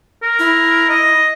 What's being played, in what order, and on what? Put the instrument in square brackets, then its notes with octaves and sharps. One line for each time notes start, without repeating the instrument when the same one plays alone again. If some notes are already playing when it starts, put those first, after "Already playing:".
[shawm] A#4
[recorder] E4
[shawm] D#5